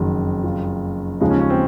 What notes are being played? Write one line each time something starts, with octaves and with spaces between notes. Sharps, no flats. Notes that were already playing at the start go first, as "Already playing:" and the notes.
Already playing: F#1 F2 D#3 F#4
F4
D#2 C#3 F3 G#3 D#4
C#4
C#4
C4